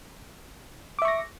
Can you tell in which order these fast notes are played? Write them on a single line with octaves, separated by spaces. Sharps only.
D6 E5 C#6 A#6